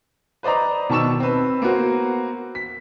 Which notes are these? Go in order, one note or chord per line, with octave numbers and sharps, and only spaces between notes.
B4 C5 D5 D#5 A#5
B2 D#3 A5 C#6 E6 E7
C4 B4
A#3 B3 F#4 C5
B6